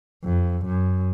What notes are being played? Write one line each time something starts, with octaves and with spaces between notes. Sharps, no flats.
F2
F#2